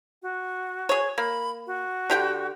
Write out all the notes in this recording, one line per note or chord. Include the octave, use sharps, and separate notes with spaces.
F#4
G#4 C#5
A#3 B5
F#4
D3 G4 G5